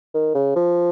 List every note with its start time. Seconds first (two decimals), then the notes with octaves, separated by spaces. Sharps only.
0.14 D#3
0.34 C#3
0.56 F3